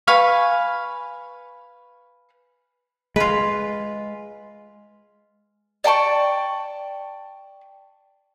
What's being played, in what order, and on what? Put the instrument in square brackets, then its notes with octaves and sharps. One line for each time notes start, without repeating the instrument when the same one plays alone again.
[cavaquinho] B4 F5 G#5 C#6
[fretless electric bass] G#3 [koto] F4 B4
[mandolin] D5 G5 A5 C#6